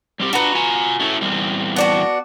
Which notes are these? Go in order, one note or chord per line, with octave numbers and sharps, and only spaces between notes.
G3 C4 G4
D4 F#4 B4 A#5
F4 G#5 A#5
A3 C#4 E4
E2 G3 C4
B3 D4 F#4